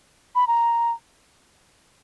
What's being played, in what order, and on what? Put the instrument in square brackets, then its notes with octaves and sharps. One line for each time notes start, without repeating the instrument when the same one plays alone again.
[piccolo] B5
A#5